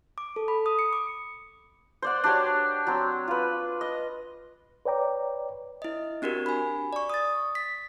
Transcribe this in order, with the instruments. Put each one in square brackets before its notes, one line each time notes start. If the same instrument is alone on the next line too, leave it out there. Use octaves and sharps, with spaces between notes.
[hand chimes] D6
A4
B5
D#6
C#7
D6
[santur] C5 D5 F#5
D4 F#4 G4 C#5
F#3 C4
F4 B4
D#5
[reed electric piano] B4 C#5 D5 G5 A#5 D6
[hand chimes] E4 D#5
C4 D4 F#4 G4 A#4
G#5 B5
D5 C#6
D#6 A6
B6